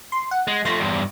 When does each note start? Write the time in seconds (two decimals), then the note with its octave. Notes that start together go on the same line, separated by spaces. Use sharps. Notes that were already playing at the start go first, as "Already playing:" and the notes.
0.12 C6
0.31 F#5
0.48 G#3
0.65 F3 A3 C6 A#6
0.79 E2 G2